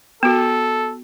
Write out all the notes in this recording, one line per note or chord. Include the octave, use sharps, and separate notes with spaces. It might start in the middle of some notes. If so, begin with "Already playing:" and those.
B3 F#4 A4